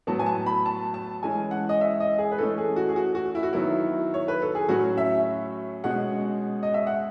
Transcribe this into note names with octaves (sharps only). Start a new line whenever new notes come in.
A2 F#3 B3 A5
G#5
A5
B5
A5
A5
E3 G#3 C#4 G#5
F#5
D#5
E5
D#5
G#4
B4
E3 A3 C#4 A4
G#4
F#4
G#4
F#4
F#4
E4
F#4
D#3 F#3 B3 E4
C#5
B4
A4
G#4
A2 F#3 C#4 F#4
E5
B2 G#3 C#4 F#5
D#5
E5
F#5